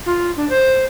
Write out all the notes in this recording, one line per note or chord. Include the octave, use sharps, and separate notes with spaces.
F4
D4
C5